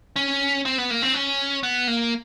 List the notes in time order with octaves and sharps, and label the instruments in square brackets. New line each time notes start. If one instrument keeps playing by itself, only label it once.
[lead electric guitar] C#4
C4
B3
A#3
C4
C#4
B3
A#3